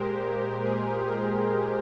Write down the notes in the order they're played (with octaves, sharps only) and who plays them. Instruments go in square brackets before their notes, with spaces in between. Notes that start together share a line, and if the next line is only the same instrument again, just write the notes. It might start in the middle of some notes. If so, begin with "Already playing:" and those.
Already playing: [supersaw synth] A#2 G#3 G4 A#4 C5
G#4
A#4